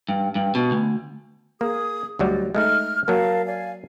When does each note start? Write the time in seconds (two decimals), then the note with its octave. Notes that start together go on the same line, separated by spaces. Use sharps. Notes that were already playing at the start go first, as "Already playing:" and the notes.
0.09 G2
0.35 G2
0.55 B2
0.71 D2
1.61 A#3 G#4 D#6
2.19 D2 F#3 G3 D5 D#5
2.55 G#3 A3 D#4 F6
3.08 F#3 A#3 A#4 F5 A5
3.45 D5 F5 G#5